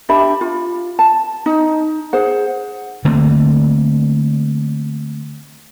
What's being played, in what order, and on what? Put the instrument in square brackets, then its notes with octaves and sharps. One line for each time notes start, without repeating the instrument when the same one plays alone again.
[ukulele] D4 G4 E5 B5
F4
A5
D#4
G#4 C5 F#5
[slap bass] D3 A3 A#3 C4